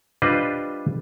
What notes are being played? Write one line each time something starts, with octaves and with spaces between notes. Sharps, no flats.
G3 D4 F4 B4 C5 D#5